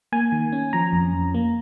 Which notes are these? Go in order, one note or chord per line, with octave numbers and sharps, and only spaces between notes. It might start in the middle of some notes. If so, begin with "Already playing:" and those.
A#3 G#5
D#3
C#4
F3 A#5
F2
F2
A#3